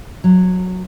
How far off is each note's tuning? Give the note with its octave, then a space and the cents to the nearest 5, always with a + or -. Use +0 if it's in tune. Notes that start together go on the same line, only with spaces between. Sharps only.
F#3 -15